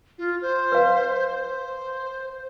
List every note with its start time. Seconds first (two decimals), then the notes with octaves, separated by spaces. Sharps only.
0.18 F4
0.42 C5
0.72 B4 F5
1.28 C5